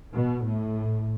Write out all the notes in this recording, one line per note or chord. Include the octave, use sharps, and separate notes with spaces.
B2
A2